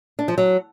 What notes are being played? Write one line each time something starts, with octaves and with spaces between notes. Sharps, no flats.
D4
F3
F#3